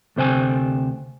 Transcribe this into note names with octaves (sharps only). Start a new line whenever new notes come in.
D2 C3 C5 G5 G#5